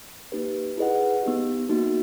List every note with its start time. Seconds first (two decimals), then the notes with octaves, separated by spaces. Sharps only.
0.32 A#3 D#4 G4 B4
0.78 E4 G#4 B4 D#5 F#5
1.23 B3 D#4 G4
1.69 A#3 D#4 F#4